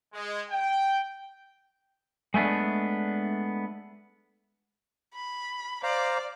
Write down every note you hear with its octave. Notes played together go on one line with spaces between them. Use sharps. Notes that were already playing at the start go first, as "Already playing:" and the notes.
G#3
G5
G#3 A3 B3 D4
B5
C5 D5 F5 A#5